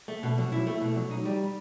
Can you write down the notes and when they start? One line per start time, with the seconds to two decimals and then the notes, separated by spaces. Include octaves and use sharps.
0.08 A3
0.23 B2
0.38 F#3
0.52 E4
0.67 A3
0.81 B2
0.96 F#3
1.11 D#4
1.25 G3